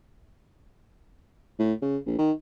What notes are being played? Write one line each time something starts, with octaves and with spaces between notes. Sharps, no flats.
A2
C#3
A#1
D#3